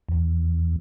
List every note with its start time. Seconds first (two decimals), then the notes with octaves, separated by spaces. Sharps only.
0.09 E2